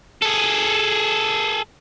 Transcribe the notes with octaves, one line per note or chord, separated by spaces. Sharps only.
G#4 A4